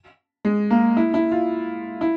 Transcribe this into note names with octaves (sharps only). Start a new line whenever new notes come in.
G#3
A#3
E4
E4
F4
E4